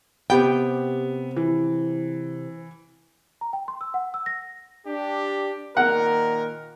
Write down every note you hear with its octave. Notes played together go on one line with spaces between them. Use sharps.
C3 B3 G4 G5
E3
A#5
G5
C6
E6
F#5
E6
A#6
D4 G4
A#2 D#3 A#4 F#5